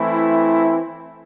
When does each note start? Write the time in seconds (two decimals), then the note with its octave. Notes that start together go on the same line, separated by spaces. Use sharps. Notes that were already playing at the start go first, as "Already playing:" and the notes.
Already playing: E3 A3 C4 E4